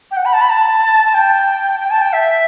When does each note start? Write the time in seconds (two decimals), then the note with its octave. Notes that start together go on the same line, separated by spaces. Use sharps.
0.11 G5
0.17 F#5
0.25 B5
0.33 A5
0.41 B5
0.50 A5
1.04 A5
1.14 G5
1.80 G5
1.90 A5
2.01 G5
2.13 E5